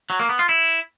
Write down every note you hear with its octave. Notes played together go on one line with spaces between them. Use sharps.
F#3
A#3
B3
F4
E4